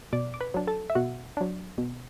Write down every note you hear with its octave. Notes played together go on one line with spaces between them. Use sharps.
B2 D5 D6
D6
B4 B5
F#3 D4
A4 A5
E5
B2 F#4 F#5
F#3 D4
B2